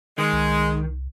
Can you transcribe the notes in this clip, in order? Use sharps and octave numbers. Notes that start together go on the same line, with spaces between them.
D#3 G#3
C2